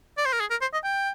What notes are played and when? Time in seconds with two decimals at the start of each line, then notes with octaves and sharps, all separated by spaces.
0.18 D5
0.26 C5
0.33 A#4
0.40 G#4
0.51 A#4
0.62 C5
0.73 D#5
0.84 G5